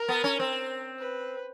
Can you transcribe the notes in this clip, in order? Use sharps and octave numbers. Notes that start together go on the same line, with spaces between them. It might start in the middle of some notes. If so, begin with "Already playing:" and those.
Already playing: A#4
B3
C#4
C4
B4